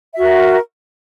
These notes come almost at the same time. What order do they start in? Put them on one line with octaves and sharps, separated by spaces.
E5 F#4 A#4